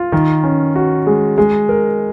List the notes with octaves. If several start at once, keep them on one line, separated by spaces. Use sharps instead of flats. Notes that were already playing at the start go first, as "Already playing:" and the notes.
Already playing: F4
D#3
C#4
F#4
G#3
G#3
A#4